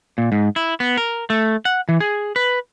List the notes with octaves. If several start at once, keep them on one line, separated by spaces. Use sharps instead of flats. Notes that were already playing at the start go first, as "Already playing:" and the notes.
A#2
G#2
E4
B3
A#4
A3
F#5
E3
G#4
B4